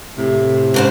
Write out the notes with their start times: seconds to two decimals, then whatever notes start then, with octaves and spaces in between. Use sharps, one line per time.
0.17 A2 C3
0.74 G#2 C#3 C5